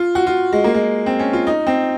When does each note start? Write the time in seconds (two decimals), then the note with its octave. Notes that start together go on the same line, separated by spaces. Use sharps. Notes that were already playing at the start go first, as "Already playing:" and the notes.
Already playing: F4
0.15 F#4
0.27 F4
0.52 G#3
0.64 A#3
0.74 G#3
1.06 C4
1.19 C#4
1.33 F4
1.47 D#4
1.67 C4